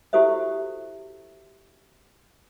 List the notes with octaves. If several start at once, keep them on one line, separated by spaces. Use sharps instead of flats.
E4 F#4 G4 A4 C5 E5